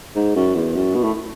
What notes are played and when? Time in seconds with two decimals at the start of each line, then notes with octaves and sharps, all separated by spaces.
0.16 G#2
0.35 F#2
0.55 E2
0.76 F#2
0.95 B2
1.04 A2